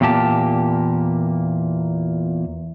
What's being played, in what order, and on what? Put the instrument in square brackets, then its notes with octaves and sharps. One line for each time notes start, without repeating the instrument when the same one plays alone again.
[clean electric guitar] E2 A#2 A#3 G4 A5